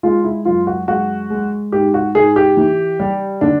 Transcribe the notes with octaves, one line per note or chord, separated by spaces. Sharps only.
G#3 F4
E4
F#2 F4
F#4
G#3 F#4
G#3
G#2 G4
F#4
G#2 G#4
G4
E3
G3
D3 D4